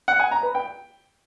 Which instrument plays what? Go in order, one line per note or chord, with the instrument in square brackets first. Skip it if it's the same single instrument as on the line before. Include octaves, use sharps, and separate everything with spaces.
[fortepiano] F#5
G#5
A#5
B4
G5